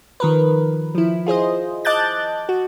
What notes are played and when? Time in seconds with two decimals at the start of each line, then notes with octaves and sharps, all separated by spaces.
0.20 D#3 F3 A#4 B4
0.95 F3 E4
1.26 F4 G#4 C5 D#5
1.85 D#5 A5 D6 F#6 G6 A6
2.49 F#4